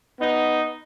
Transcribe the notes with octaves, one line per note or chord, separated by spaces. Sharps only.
B3 D#4